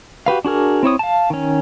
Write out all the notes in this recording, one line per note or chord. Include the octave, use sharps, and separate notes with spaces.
F#4 G4 B4 F5
D4 F#4 G#4 A#4
C4 E4 C#5 D#6
F5 A5
D#3 C#4